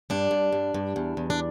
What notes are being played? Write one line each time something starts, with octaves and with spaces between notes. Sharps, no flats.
G2 D4
G2
G2
G2
E2
E2
D4